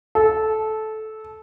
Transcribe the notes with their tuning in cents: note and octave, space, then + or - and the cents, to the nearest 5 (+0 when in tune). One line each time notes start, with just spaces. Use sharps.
A4 -15